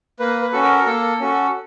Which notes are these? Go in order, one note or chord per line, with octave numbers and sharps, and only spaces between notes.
A#3 B4
B4
C#4 F#4 A4
A#4
A#3 A4
C#4 F#4 A4